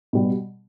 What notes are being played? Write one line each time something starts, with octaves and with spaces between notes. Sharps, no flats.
B2 G3